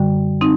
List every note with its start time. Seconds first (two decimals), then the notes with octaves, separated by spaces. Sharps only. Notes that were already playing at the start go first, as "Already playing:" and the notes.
Already playing: F#2 D3 G3
0.41 C4 D#4